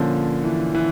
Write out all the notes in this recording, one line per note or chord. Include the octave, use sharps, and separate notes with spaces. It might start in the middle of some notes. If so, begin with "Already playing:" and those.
Already playing: A#2 D3 F3 A#3 C#4
E3
E3